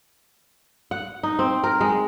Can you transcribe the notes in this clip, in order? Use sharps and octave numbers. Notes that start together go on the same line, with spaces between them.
F#5
D#4
C4
A#4
G#3